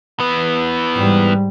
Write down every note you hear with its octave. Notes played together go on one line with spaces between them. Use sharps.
E3 B3
G#2 G3